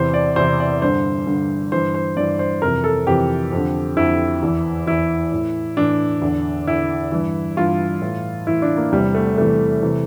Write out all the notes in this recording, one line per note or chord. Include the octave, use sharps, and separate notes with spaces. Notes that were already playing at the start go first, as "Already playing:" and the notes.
Already playing: E2 C3 E3 C5
D5
E2 C3 E3 C5
D5
G2 D3 C5
G2 D3
G2 E3 C5
C5
G2 E3 D5
C5
F2 C3 E3 A#4
A4
F2 C3 E3 G4
F2 D3
F2 D3 E4
E2 E3
E2 E3 E4
A2 E3
A2 E3 D4
E2 D3
E2 D3 E4
G2 E3
G2 E3 F4
A2 E3
A2 E3 E4
D4
A#3
E2 C3 E3 G3
A3
E2 C3 E3 A3
C3 E3